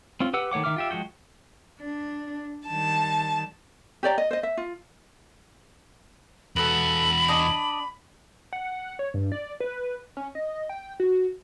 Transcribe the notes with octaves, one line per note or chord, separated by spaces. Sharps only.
C4 C#4 F4
G4 B4 F#5 E6
D#3 A3 C#5 F#5 D6
D#3 E5 D6 F6
F4 G4 E5
F3 G#3 F#4 G5
D4
D#3 G3 A5
G4 C#5 D5 A#5
D#5
C5 D#5
E5
F4
E2 B3 F#4 A4 B5 F#7
D4 D#5 G#5
F#5
C#5
G2
D5
B4
C#4
D#5
G5
F#4